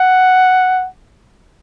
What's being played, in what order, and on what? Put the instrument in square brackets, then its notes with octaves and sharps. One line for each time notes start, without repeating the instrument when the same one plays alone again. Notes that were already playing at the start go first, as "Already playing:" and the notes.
Already playing: [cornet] F#5